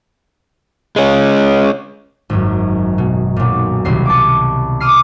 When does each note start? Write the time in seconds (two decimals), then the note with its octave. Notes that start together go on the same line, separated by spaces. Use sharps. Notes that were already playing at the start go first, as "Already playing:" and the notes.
0.96 G#3 C#4
2.30 G#1 F#2
2.98 B2
3.36 B1 A#2
3.85 D#1 C2 B2 C7
4.06 A5 D6
4.81 C6 D6 D#6 F6 C7